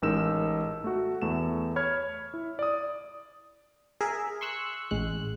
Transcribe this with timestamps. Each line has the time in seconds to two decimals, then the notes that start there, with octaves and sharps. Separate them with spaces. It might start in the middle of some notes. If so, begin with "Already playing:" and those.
0.02 A1 G#3 D#4 A#4 E6 E7
0.84 A3 F#4
1.22 E2 A3 E7
1.76 C#5 B5 F6 G#6
2.34 E4
2.59 D5 D#6
4.01 G#4 A#4 E5
4.41 C6 C#6 E6 F#6
4.91 A1 G#3 F#6